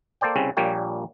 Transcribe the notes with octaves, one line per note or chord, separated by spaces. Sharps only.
A#3 A4 C5 D5 G5
C2 C#3 G3 C4 C#4
A#1 A#2 G3 A#3 C#5 G5